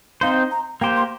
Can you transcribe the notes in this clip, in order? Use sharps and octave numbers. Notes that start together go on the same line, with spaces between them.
C4 D#4 C5 F5
A#5
A#3 G4 C5 G5
C6